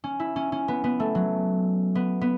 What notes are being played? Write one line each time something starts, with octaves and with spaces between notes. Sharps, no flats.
C#4
E4
C#4
C#4
B3
B3
A3
F#3
B3
B3